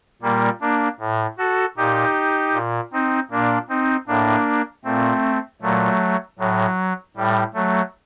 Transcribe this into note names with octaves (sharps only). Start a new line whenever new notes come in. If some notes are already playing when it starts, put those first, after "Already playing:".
A#2 G3 A#3
A#3 D4
A2
F#4 A4
A#2 D#4 G4
A#2
C4 D#4
A#2 A#3 D4
C4 D#4
A2 A#3 D4
A#2 A3 C4
A#2 F#3 A3
A2 F#3
A2 G3
F#3 A3